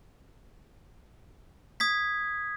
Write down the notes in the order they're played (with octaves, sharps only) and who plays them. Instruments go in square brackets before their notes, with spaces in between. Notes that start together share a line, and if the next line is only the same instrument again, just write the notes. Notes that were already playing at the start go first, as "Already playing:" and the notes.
[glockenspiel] D#6 G#6 B6